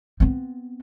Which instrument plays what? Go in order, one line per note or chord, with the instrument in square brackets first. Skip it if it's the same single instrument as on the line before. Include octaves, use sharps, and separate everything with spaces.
[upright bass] B3 C4